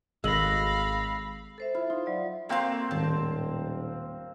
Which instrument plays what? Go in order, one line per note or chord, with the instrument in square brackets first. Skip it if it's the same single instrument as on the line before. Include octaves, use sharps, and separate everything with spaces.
[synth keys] G#1 A#6 [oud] G#3 [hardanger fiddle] F5 B5 [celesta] E6 F#7
[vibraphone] A4 C5 E5
[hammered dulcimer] E4 [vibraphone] F4 C5
[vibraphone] D#4 [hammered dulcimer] F4
[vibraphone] F#3 D5
[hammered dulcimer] A#3 C4 [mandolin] F#4 F5 G6
[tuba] D#1 [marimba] A2 D#3 G#3 [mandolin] A5